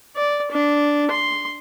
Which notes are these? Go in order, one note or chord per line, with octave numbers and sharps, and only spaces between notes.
D5
D4
C6